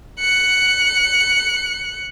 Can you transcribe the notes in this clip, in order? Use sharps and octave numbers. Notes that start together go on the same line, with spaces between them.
F#6 C#7